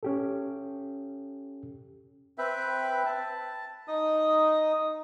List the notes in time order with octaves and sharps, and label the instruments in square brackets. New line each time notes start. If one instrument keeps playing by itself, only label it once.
[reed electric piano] C#4 G4 A4
[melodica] C4 B4 E5 G5
A5
D#4 D#5 D#6